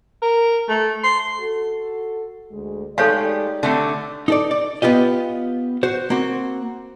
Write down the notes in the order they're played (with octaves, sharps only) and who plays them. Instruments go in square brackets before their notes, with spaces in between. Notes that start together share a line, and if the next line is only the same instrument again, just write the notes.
[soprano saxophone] A#4
A3
C6
[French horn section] F#4 A4
D2 G#3
[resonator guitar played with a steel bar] G#3 A3 [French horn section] D#4 G4 D5 [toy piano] A4 C#5 F5
[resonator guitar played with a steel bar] D3 A3 C4
[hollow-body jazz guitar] D#4 A4 D5
D5
B3 F4 G4 D#5
F#4 C5
A#3 C4 F#4